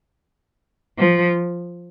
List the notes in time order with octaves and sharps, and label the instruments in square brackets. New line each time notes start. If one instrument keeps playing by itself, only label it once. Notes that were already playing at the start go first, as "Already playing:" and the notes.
[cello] F3